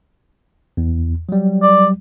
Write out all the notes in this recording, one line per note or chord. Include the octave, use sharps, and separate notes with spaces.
E2
F#3 G3
D5